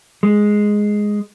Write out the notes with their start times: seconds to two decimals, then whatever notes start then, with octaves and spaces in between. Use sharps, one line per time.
0.23 G#3